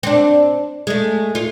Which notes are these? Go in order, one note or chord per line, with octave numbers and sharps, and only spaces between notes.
C4 D4
G#3 A3
F4